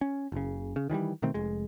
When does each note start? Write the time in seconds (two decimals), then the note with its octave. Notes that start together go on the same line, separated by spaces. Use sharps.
0.01 C#4
0.32 F#1 C#3
0.76 C#3
0.90 D#3 E3 F#3 G3
1.22 B2 D#3 A3 C4
1.34 F1 G#3